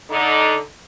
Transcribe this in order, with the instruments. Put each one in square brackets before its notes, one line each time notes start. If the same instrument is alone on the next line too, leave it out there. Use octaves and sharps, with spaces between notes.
[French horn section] D3 D#4